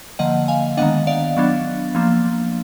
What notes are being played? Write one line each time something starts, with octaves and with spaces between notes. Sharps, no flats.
D3 F3 A#3 D#5 F#5
F5 G#5
D#3 G#3 B3 D4 D#5 F#5
D5 F5
F#3 B3 D4
F3 A#3 D4